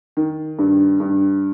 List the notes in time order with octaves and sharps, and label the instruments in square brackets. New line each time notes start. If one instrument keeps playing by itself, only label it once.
[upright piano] D#3
G2
G2